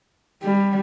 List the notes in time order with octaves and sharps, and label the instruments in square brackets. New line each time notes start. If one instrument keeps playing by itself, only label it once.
[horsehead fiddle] G3